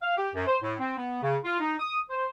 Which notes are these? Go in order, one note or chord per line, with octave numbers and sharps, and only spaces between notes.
F5
G4
F#2
C5
A2
C4
B3
C#3
F4
D#4
D#6
C5